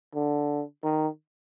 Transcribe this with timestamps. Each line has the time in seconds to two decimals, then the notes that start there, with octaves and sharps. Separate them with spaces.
0.15 D3
0.84 D#3